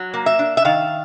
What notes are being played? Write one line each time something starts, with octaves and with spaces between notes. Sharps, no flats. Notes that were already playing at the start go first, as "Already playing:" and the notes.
Already playing: F#3
A#3
E5
D4
E5
D#3 F5